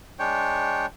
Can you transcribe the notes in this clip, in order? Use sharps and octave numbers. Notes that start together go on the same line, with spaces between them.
G#3 D4 C#5 G5